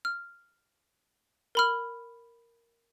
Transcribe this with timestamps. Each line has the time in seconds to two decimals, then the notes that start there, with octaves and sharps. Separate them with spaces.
0.05 F6
1.55 A#4 B5 F6